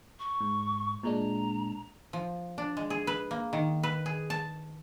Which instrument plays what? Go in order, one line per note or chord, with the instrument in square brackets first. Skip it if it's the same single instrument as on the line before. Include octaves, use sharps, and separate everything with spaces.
[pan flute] C#6
[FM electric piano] G#2
[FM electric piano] A#2 G#3 D4 [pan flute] A#5
[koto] F3
D4
G#3
G#4
B4
A#3
D#3
B4
G#4
A5